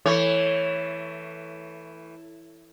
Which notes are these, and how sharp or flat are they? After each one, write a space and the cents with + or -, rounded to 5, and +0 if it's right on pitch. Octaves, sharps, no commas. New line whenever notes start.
E3 +0 A3 +20 C#5 +0